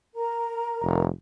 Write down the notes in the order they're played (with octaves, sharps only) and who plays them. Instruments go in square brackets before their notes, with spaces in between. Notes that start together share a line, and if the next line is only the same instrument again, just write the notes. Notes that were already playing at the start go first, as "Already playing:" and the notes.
[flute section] A#4 A#5
[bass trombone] F1